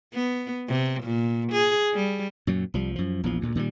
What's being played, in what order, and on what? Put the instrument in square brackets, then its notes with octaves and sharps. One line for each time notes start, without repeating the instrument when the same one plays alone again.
[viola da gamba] B3
C3
A#2
G#4
G3
[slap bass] F#2 A#2 F#3
C2 F3 G3
F#2 F3
A#1 E2 F3
D2 A#2
A#2 D#3 E3 G3